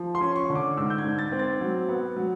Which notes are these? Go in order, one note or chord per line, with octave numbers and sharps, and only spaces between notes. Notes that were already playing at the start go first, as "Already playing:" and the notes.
Already playing: F3
C6
C#4
C#6
D3
D6
G#2 E6
G6
G#6
G#2
A6
C4
A6
F#3
B3
F#3